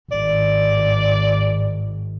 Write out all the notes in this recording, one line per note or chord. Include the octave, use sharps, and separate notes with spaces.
G#1 D5